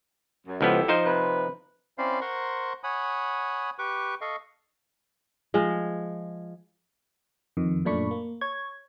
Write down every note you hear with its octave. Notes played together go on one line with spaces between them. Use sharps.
F#2
C#2 F3 B3 E4 G4 A4
F3 D#4 C5
C3 B4
C4 C#4 E4 C5 D5 F5
A#4 C5 F#5 A#5 C6 C#6
C#5 F#5 G#5 B5 D#6
G4 B4 C#6 D6
A4 D#5 F5 C#6
F3 G#3
F2 D#3
F#2 A#2 A3 D4 B5 C#6
A#3
C#5 G#6